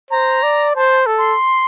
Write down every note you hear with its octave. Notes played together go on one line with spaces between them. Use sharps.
C5 A#5
D5
C5 A5
A4
C6